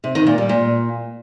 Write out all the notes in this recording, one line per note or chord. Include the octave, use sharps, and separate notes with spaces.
C3
D#3
A#2
G3
A#2